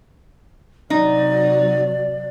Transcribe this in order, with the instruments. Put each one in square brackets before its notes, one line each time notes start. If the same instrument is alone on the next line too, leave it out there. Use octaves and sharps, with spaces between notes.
[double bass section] C3 F#3 [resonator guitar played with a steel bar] D#4 [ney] D5